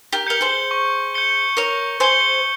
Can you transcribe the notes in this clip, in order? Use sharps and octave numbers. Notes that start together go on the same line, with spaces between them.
G4 A#4
A#4 G6 C#7 G7
G#4 C5
C#6
G6 C#7 G7
A#4 C#5 C#6
G#4 C5 G6 C#7 G7